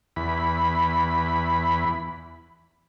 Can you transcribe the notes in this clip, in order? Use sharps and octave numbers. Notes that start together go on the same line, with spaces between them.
E2 B5